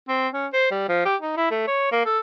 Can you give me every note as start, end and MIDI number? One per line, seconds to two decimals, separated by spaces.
0.08 0.28 60
0.34 0.47 61
0.53 0.67 72
0.71 0.88 55
0.89 1.04 53
1.05 1.16 67
1.21 1.36 63
1.37 1.47 64
1.51 1.65 57
1.67 1.87 73
1.92 2.01 58
2.06 2.19 69